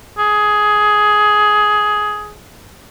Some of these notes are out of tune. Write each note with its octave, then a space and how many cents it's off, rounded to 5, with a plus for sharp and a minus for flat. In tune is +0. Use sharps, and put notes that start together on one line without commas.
G#4 +10